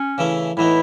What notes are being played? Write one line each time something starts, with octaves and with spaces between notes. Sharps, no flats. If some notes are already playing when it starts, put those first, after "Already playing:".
Already playing: C#4
C#3 E3 A3 E4
A2 E3 B3 D#4 E4